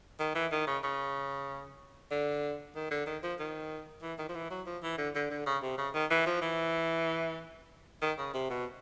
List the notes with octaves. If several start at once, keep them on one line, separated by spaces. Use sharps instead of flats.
D#3
E3
D#3
C#3
C#3
D3
D#3
D3
D#3
F3
D#3
E3
D#3
F3
E3
F#3
F3
E3
D3
D3
D3
C#3
C3
C#3
D#3
E3
F3
E3
D#3
C#3
C3
B2